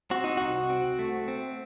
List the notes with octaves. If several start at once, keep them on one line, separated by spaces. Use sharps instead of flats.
C4 F#4
D#4
C2 F#4
C4
A3
C4